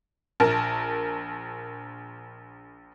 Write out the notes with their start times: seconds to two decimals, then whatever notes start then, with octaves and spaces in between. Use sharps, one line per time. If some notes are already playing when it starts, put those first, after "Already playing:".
0.40 A#1 A#4 A5